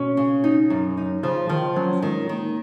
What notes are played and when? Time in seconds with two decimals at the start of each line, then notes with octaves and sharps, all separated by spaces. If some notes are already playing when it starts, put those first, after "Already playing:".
Already playing: B2 C#4
0.17 C#3
0.44 D#4
0.70 F#2
0.97 D#4
1.23 C#3 F3
1.49 D#3 F3
1.76 F#3 C#4
2.02 D#3 G#3
2.29 D#3 A#3